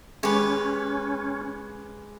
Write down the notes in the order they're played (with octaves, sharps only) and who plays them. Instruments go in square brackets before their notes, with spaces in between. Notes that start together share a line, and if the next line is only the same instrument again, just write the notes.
[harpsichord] G#3 G4 [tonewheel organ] C#4 [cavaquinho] B4 C#5